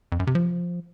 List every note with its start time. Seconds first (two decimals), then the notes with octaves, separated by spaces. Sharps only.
0.12 F2
0.20 F#2
0.27 C3
0.35 F3